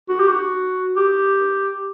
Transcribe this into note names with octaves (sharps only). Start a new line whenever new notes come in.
F#4
G4
F#4
G4